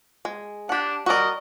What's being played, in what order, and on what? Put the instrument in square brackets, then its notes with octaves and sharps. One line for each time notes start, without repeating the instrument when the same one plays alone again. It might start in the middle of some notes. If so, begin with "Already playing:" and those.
[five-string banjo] G#3
[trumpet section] D4 [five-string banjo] G4 F#5
[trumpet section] G3 A#4 D#5 [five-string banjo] F#4 D5